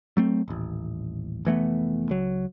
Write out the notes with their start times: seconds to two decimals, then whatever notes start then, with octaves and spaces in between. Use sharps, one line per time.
0.17 F#3 A3 C4
0.48 D#1 A1
1.45 F1 E3 A3 B3
2.09 C#2 F#3